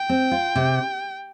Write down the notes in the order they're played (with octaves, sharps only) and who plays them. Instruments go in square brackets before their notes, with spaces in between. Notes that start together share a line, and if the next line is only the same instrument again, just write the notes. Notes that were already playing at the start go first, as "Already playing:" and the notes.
Already playing: [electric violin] G5
[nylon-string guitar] C4
F4
C3